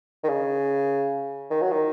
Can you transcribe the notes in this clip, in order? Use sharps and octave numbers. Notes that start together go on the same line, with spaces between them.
D#3
C#3
D#3
F#3
D#3